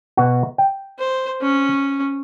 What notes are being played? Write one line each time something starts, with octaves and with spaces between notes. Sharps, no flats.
B2 F#4
G5
C5
C#4